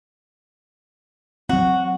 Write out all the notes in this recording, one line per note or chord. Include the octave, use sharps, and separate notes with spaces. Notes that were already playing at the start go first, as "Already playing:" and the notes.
F#3 C4 F#4